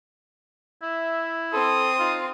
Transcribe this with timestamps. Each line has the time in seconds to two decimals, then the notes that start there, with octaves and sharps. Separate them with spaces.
0.82 E4 E5
1.53 C4 A4 C6 D#6
2.00 D#4 F4